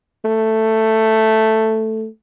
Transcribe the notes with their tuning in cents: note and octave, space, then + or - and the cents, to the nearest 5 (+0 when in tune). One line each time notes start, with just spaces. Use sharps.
A3 +5